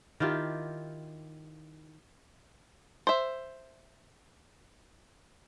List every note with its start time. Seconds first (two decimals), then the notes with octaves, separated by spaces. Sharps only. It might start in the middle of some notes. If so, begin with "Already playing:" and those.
0.20 D#3 E4 F4 G4
3.07 C5 E5